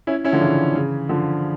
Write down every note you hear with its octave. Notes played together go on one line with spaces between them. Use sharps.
C#4 E4
C#4 E4
D3 F3
C#3 E3
C#3 E3
D3 F3